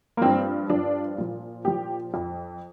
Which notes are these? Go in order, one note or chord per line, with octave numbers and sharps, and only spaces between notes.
A#3
G2 F3 C4
G2 F3 D4
A#2 F3
A#2 F3 G4
F2 F3